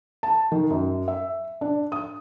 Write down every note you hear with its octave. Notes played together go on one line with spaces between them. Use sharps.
A5
D#3
F#2
E5
D4
D#6